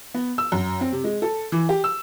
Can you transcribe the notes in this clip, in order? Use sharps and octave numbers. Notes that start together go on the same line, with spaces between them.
B3
E6
F#2
C4
C3
G#3
A4
E3
G4
E6